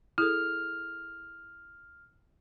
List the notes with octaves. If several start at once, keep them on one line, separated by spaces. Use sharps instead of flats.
E4 G#4 A4 F6